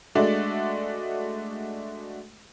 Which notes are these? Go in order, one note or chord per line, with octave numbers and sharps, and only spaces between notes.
G#3 A3 D4 F#4 A4 D5